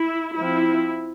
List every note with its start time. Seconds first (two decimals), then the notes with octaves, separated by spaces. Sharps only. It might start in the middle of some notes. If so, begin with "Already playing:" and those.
Already playing: E4
0.37 F3 C4 E4